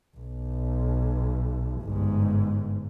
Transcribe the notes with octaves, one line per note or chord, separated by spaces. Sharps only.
B1
G1 G#2